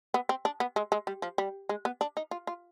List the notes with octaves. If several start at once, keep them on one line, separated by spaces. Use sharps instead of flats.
B3
C4
D4
B3
G#3
G#3
G3
F3
G3
G#3
B3
D4
D#4
F4
F4